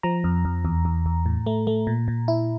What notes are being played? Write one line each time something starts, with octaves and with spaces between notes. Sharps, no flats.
F3 A#5
F2
F2
E2
E2
E2
A2
A3
A3
A#2
A#2
E4